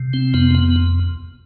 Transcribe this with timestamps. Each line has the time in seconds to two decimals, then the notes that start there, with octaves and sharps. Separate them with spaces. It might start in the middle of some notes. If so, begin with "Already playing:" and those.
Already playing: C3
0.13 C4
0.34 F2 B3
0.55 B3